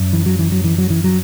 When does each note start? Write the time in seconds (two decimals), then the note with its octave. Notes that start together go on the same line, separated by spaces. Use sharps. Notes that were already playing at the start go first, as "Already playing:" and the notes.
Already playing: F#2
0.13 E3
0.26 F#3
0.39 E3
0.52 F#3
0.64 E3
0.78 F#3
0.90 E3
1.04 F#3